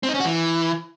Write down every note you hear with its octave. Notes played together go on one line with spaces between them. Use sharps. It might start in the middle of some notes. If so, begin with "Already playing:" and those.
C4
D#4
C#4
F#4
E3